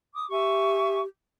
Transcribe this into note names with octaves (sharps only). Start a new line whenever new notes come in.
D6 D#6
G4 E5 G#5 C#6